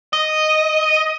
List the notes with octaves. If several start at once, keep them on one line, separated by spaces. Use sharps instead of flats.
D#5